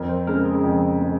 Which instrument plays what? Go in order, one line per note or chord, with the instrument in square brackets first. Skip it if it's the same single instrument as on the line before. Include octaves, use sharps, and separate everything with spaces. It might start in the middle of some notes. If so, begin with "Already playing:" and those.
Already playing: [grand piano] F2 [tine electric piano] A#4
[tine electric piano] C5
[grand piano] C#3 G#3 [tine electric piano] A#4
[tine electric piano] G#4
[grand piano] F2
G#3